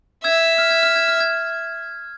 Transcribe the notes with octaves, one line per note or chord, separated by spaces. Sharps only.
E5 E6 G#6
F6
G#6
F6
G#6
F6
G#6